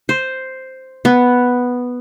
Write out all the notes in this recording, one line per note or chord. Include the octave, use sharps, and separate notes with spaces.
C5
B3